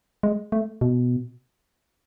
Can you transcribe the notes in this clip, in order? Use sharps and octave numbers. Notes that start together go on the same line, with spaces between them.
G#3
A3
B2